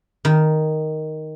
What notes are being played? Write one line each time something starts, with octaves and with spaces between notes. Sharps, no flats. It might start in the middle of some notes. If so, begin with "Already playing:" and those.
D#3